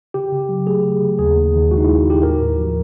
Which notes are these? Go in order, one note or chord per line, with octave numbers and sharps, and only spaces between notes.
C#3 G4
C#3
F#3
A3 G#4
C#3
C#3
D#2 G#4
D#2
D#3
G#3 F#4
D#4
E4
D#2
D#2 G4
A2 A#4
A2
F3